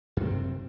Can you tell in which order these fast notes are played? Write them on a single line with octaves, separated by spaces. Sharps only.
F#2 C3 C4